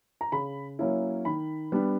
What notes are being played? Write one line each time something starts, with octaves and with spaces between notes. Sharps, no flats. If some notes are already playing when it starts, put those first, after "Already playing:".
A#5
C#3 B5
F#3 A#3 C#4 E4
D#3 B5
G3 B3 D4